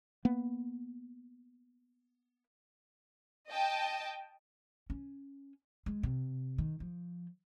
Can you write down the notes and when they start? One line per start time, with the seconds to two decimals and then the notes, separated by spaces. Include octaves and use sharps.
0.25 A#3 B3
3.50 D#5 G5 A5
4.90 C#4
5.86 G#3
6.03 C3
6.58 D#3
6.80 F3